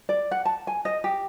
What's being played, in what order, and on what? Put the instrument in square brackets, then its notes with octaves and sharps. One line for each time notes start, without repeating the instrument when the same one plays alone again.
[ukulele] D5
F#5
A5
G#5
D#5
G4